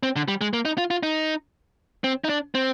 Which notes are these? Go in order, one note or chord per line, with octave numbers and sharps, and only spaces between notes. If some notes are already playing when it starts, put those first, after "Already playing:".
C4
D3
G3
G#3
A#3
D#4
F4
F4
D#4
C4
D#4
D4
C4